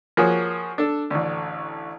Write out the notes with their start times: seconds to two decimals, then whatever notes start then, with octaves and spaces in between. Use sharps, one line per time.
0.17 F3 A#3 F#4 G#4 C#5
0.78 D4 A4
1.10 A1 D2